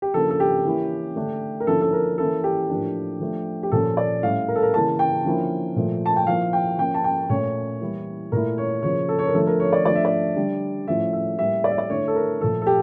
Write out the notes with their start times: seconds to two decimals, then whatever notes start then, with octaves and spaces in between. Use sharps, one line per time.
0.02 G4
0.14 C#3 F3 A#3 D4 A4
0.30 A4
0.40 G4
0.65 E3 A#3 C#4 E4
1.16 D3 A3 D4
1.60 A#4
1.67 D3 F3 A#3 C#4 E4 A4
1.82 A4
1.93 A#4
2.18 E3 A#3 C#4 E4 A4
2.44 G4
2.70 A2 F3 A#3 D4
3.20 F3 A3 D4
3.63 G4
3.72 A#2 F3 C#4 A4
3.97 D5
4.23 A2 G3 C#4 E4 F5
4.48 A#4
4.55 A4
4.62 A#4
4.74 C#3 E3 A#3 C#4 A5
4.99 G5
5.25 D3 F3 A#3 C#4 E4
5.76 A#2 F3 A3
6.06 A5
6.16 G5
6.27 F3 A#3 E4 F5
6.53 G5
6.78 F3 A#3 C#4 G5
6.94 A5
7.04 G5
7.30 A#2 A3 C#4 C#5
7.81 E3 G3 A#3 E4
8.32 A#2 A3 E4 A#4
8.58 C#5
8.82 C#3 F3 A#3 C#5
9.09 A4
9.19 C#5
9.26 A#4
9.34 D3 F3 A3 D4 A4
9.47 A#4
9.60 C#5
9.73 D5
9.85 F3 A3 D4 D5
9.95 E5
10.05 D5
10.36 D3 G3 D4
10.87 A2 F3 A3 C#4 E5
11.13 E5
11.38 A2 G3 A#3 E5
11.64 D5
11.71 E5
11.78 D5
11.90 D3 A3 E4 C#5
12.08 A4
12.16 A#4
12.41 A#2 F3 A3 A4
12.62 A4
12.67 G4